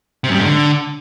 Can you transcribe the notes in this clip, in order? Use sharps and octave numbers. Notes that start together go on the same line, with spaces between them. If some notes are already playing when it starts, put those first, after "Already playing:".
C3
F#2
G3
G#2
D3